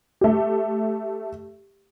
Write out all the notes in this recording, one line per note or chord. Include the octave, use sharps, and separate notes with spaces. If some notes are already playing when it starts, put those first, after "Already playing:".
A3 G4